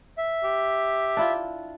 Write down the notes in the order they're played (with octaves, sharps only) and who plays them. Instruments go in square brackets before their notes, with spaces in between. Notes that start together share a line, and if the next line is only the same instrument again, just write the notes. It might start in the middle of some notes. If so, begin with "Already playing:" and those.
[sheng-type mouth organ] E5
[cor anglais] G4
[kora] D4 E4 F4